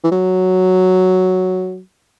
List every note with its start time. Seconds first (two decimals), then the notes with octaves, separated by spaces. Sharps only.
0.04 E3
0.12 F#3